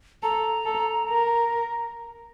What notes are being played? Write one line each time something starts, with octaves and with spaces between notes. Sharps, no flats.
A4 A#5
A4
A#4